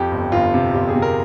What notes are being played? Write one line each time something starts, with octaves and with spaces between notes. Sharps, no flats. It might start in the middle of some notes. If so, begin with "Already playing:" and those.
Already playing: F2 G4
G1
G1 F4
C3
G1 G4
G#4
C3
A#4